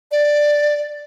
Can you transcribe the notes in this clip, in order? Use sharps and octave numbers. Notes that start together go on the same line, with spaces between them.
D5